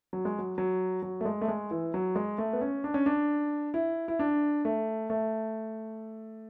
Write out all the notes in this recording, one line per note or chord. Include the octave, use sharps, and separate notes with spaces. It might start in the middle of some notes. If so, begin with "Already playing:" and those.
F#3
G#3
F#3
F#3
F#3
A3
G#3
A3
G#3
E3
F#3
G#3
A3
B3
C#4
D4
C#4
D4
E4
E4
D4
A3
A3